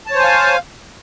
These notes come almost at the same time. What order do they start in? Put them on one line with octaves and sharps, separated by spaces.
A5 C#5 C5 G#5 F5